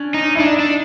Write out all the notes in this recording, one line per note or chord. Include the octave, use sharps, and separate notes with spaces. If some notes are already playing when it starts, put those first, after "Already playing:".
Already playing: C#4 D4
D#4
E4
D4 D#4
D4